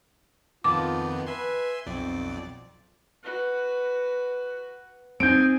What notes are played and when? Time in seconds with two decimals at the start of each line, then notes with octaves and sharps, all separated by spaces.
0.64 F2 D#3 B3 F4 A5 D6
1.26 B4 E5 G#5 C6
1.86 B1 F2 C4 D5
3.24 F#4 B4
5.20 C4 D#4 G#4 G#5 G6 D7